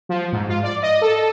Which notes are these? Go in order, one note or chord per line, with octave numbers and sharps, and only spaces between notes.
F3
G#2
F4
D5
D#5
A4